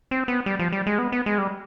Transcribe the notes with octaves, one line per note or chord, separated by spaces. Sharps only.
C4
B3
G3
F3
G3
G#3
B3
B3
G#3
G3